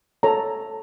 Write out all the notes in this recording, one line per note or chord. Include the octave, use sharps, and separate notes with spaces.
A4 C#5 A#5